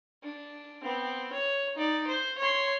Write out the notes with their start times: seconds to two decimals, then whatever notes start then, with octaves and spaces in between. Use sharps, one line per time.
0.23 D4
0.84 B3 C4
1.33 C#5
1.76 D#4 D5
2.08 C5
2.38 C#5 C6